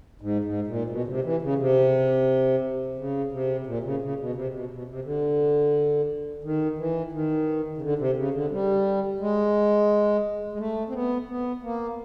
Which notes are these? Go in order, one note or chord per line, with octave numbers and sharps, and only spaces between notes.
G#2
G#2
A#2
B2
C#3
C3
E3
C#3
C3
C#3
C3
A#2
C#3
C#3
B2
C3
B2
B2
C3
D3
D#3
E3
D#3
C#3
D3
C3
C#3
D3
G3
G#3
G#3
A3
C4
B3
B3
A#3